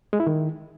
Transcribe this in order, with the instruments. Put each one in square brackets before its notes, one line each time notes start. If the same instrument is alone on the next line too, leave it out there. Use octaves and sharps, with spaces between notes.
[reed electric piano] G#3
E4
D#3